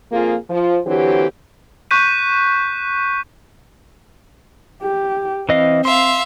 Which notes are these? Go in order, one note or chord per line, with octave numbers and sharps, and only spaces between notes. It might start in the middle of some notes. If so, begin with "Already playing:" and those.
F2 A#3 F4 G#4
F3
D3 E3 F#3 C4 G4
C#6 F#6 G6 B6 D#7
G4
E3 C4 D#5 F5
E5 F5 C6